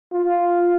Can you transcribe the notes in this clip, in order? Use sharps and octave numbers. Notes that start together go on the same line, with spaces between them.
F4